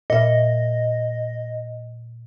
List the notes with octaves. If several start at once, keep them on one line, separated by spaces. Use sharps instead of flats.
A#2 D#5 E5